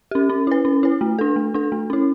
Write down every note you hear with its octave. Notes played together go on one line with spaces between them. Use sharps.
C#4 G4
C#4
E4 B4
C#4
E4 B4
A3
D4 A4
A3
D4 A4
A3
C#4 E4